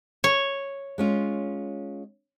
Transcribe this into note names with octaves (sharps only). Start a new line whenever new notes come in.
C#5
G#3 C#4 F4